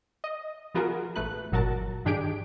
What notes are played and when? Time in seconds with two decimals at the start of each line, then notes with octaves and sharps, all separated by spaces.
0.24 D#5
0.74 F3 B3 F4 F#4 G#4 A#4
1.16 A1 A3 B4 F#6
1.52 G1 A#2 F#3 F#4 A#4 A5
2.05 G2 D#3 D4 G4 G#4 D7